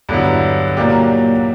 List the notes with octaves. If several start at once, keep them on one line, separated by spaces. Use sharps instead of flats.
G2 D3 F#3 B3 E4
A#2 F#3 A#3 D4 G4